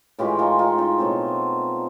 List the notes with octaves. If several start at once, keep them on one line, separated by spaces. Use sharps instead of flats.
A2 E3 G#3 F4 G4
D#4 F4
D#4 F4
D#4 F4
B2 F#3 A3 C4